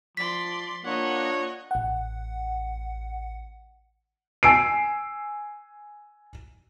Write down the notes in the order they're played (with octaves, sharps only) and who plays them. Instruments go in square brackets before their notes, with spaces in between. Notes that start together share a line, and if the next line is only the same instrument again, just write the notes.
[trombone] F3 [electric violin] D5 C6 [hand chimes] B6
[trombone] A#3 [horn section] D4 F4 C#5 [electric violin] D#5 F#5
[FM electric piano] A1 F#5
[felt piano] G#5 E6 C7 D7